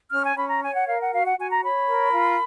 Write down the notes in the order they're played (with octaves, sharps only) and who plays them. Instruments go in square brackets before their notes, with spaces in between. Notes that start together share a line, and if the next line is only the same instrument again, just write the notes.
[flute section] C#4 F6
G#5
C#4 B5
A#5
C#5 G#5
F#5
A#4 F5
F#5
F#4 F5
F#5
F#4 G#5
A#5
C#5 B5
A#4
F4